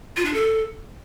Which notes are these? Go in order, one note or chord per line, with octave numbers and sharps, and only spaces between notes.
F4
D4
A4